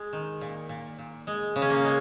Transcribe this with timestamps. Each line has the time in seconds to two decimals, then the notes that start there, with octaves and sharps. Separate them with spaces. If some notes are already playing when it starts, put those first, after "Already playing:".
Already playing: G#3
0.13 D#3
0.41 A#2
0.69 A#2
0.98 A#2
1.27 G#3
1.56 C#3
1.62 C#4
1.70 A#3
1.84 G#3